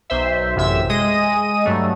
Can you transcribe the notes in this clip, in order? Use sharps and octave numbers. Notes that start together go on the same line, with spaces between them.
B1 C5 E5
A1 F#2 C3 E5 E6
G#3 D#5 D#6 D#7
G2 F#3 A3